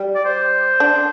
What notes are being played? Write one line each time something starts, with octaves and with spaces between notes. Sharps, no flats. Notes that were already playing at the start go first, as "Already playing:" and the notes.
Already playing: G3
D5
C5
D4